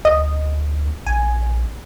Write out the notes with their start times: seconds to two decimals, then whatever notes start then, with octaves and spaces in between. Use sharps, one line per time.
0.05 D2 D#5
1.06 A#1 G#5